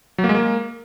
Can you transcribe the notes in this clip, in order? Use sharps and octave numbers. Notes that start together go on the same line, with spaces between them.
F#3
A#3
G#3
A#3